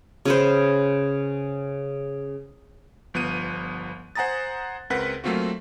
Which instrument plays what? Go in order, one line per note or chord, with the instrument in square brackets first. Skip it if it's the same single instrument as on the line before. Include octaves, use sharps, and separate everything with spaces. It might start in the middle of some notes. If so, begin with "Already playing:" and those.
[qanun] C#3 B4 C5
[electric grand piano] G1 F3 B3 F#6 D#7
C5 F#5 G#5 A#5 D#6 A6
C#2 C4 A#4 B4 F#5 B6
F#3 A3 A#3 C4 F4 F#4